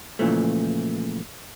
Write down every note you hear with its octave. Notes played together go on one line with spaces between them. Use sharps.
A#2 C#3 E3 F3 A3